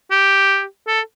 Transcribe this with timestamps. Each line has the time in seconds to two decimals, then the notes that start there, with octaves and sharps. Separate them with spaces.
0.11 G4
0.87 A4